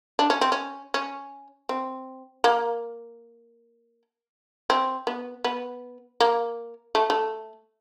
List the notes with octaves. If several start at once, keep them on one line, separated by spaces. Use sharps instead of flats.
D4
C#4
C4
C#4
C#4
C4
A#3
C4
B3
B3
A#3
A3
A3